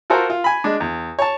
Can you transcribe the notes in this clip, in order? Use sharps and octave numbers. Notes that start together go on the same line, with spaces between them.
F4 F#4 A4 A#4 C5
F4
G#5 B5
G#3 D4
E2
C#5 A5